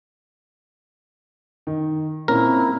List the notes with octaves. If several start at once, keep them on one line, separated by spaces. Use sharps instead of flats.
D#3
A#2 C4 C#4 E4 A#4